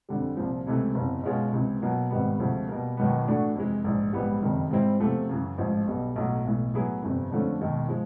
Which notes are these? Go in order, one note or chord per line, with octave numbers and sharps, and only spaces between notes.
F2 D3 G3
C2 A#2 F3
C#2 C3 E3 A3
F#1 E2 C3
B2 G#3 C#4 F4 G#4
C#2 C3 E3
B2 F#3 A#3
G#1 G#2 D#3 G3 B3
D2 C3 F3 G#3
B2 G3 A#3
E1 D#2 D#3 F#3 B3
A2 E3 A3 D4 F#4
F2 C3 E3 G#3
A#1 G#2 E3
A#1 G#2 E3 G3 B3
F#1 F2 C3 D#3 G3
G#2 E3 G3 C4 E4
E2 C3 F3 A3
F#2 C#3 E3
A1 G#2 F3
B1 B2 G3
B1 A2 F#3
B1 A2 E3
A2 F#3 B3 E4 G#4
G1 F2 C3 E3
F2 D3 F3 A3 C#4
E1 D#2 D#3
F3 G#3